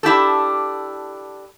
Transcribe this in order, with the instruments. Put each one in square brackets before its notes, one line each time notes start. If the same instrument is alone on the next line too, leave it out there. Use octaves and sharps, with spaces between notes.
[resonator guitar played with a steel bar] D4 E4 G4 A4